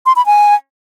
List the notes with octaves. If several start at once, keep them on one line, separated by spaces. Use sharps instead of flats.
C6
B5
G#5